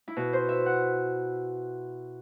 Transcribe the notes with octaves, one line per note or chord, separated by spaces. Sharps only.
E4
B2 F#4
C5
E5
F#5